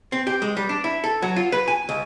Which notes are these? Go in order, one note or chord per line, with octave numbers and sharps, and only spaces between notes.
C4
G4
G#3
G3
D4
E4
A4
F#3
F4
B4
G#5
C#2